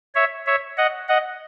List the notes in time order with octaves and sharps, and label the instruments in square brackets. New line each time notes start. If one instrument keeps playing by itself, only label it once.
[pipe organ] C#5 E5
C#5 E5
D#5 F#5
D#5 F#5